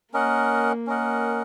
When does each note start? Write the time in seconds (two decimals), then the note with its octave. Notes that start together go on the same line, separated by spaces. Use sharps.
0.13 A#3 C#4 A#4 D#5 F#5
0.87 C#4 A#4 D#5 F#5